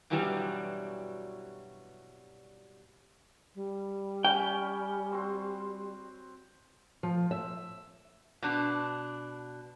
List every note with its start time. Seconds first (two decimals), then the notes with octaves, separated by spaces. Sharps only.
0.10 G2 B2 E3 F#3 G3
3.55 G3
4.25 C#4 G5
5.11 C4 F#4 C5
7.03 F3
7.31 E5
8.42 B2 D4